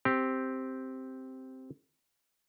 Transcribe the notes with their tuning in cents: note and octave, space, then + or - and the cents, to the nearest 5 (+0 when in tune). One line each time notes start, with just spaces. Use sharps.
C4 +0 G4 +0